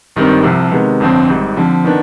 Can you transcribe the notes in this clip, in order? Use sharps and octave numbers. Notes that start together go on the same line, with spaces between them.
G#1 G2 D#3 G3 C4
C2 C3 F3
C3 D#3 G#3 B3
G1 F2 D3 F3 C4
G#1 G#2 G3
D3 F3 C4
D#3 B3 D4